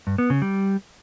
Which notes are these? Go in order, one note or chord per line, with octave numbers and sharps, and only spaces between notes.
G2
B3
C#3
G3